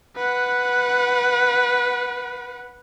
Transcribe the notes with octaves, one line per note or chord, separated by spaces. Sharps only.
B4 F#5